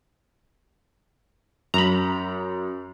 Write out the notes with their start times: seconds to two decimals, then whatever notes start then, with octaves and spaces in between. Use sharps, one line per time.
1.74 F#2 A#5 B5